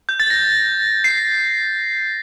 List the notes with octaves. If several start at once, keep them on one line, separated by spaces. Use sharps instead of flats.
G6
A6
A#6
C7